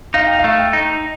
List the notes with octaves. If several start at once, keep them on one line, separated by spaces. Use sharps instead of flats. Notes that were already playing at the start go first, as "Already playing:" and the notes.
D#4 F5
G5
F5
A3
G5
D#4